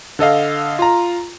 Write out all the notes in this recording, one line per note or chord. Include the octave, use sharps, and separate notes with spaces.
D3 A4 D#5 F5
F4 A#5